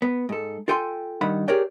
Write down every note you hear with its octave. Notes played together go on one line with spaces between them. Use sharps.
B3
G#2 A4
F4 A4 G5 G#5 C6
G2 D#3 F#5 B5
G4 G#4 A#4 C#5 D5 G5